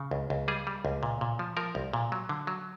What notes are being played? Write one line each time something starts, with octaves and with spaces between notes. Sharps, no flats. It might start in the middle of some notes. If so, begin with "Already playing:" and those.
Already playing: C#3
C#2
C#2
G3 G#4
G3
C#2
A#2
A#2
F3
F3 A#4
C2
A#2
F#3
D3
F#3